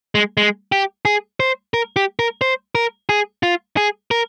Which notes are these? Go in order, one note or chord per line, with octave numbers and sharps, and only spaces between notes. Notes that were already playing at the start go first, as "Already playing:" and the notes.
G#3
G#3
G4
G#4
C5
A#4
G4
A#4
C5
A#4
G#4
F4
G#4
A#4